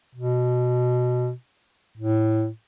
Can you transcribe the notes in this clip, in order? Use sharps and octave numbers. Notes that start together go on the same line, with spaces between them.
B2
A2